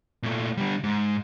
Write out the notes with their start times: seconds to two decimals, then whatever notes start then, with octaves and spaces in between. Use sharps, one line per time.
0.23 A#2 A3
0.57 D3 G3
0.84 G#2